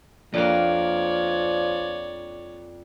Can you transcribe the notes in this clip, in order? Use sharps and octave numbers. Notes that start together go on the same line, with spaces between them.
F2 F3 A#3 D4 C#5 D5